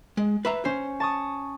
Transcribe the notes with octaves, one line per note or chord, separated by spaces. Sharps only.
G#3
B4 E5 A#5
C#4 C5
A5 C#6 D#6